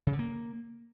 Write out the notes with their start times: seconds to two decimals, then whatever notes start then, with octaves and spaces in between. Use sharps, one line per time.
0.07 C#3
0.13 D3
0.19 A#3